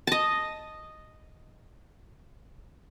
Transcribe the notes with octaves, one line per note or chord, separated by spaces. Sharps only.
D#5 A5